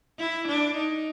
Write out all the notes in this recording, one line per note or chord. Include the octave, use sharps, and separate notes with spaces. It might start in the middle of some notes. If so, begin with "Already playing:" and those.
E4
D4
D#4